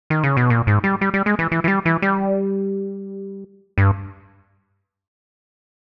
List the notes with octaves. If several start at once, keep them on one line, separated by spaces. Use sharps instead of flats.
D#3
C#3
B2
A#2
G#2
G3
G3
G3
G#3
E3
E3
E3
G3
E3
G3
G2